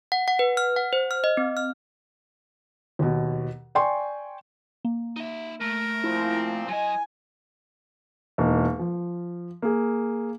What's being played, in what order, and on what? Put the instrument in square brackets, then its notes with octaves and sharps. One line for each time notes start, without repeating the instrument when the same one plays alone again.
[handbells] F#5
F#5
B4
F6
F#5
C5
F6
D#5
C4
F6
[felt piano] D#2 B2
D5 G5 G#5 C6 C#6
[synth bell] A#3
[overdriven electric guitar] D#4 E5
[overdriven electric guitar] A3 [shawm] A#4
[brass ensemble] A#2 F3 C4 [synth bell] E4
[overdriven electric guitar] F#3 D#5 [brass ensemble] G#5
[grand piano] E1 A#3 D#4
F3
A#3 G#4